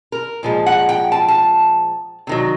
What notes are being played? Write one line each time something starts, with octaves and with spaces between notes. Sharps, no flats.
A#4
A#2 F3 G#3
F#5
G5
A5
A5
C3 D#3 F#3